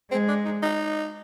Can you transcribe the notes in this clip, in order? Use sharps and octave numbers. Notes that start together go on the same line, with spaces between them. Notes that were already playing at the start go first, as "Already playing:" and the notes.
G#3 C4
D4
D#4
D#4